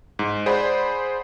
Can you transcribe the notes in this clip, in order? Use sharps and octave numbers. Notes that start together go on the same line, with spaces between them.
G#2
G#4 C5 D5 F#5 B5